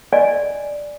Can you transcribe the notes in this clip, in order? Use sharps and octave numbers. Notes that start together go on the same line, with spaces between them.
D5 D#5 G#5